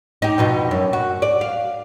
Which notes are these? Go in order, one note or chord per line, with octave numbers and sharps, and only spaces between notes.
D#4 G4
F2 B2 D#4
F#2
F#4
D5
F5